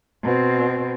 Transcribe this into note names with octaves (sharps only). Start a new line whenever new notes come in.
B2 C4